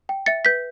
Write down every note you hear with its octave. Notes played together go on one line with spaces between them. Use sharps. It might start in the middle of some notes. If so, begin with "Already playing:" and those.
G5
E5 A6 C#7
B4 G6 B6